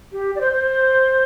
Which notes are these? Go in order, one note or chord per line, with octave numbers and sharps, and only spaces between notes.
G4
D5
C5
C5